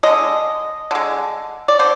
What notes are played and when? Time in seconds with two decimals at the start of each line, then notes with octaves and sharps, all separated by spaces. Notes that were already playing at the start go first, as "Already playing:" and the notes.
0.03 D3 G#3 D#5
0.91 D3 G#3
1.68 D5
1.79 D3 C5